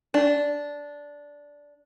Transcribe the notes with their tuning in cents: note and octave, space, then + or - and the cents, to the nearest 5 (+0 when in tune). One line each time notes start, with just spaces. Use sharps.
D4 -10